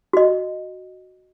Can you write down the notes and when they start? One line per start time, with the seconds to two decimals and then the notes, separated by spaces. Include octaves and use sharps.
0.13 F#4 D#5